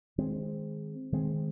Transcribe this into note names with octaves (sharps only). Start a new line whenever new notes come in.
D#3 G#3 C4
D#3 G#3 C4